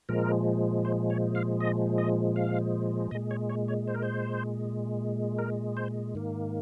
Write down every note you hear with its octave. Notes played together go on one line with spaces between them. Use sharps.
A#2 F3 G#3 A#4
C5
C#5
F5
D#5
D#5
F5
A#2 G#3 D#5
C#5
C#5
C#5
C5
A#4
C5
A#4
C5
G#2 D#3 A#3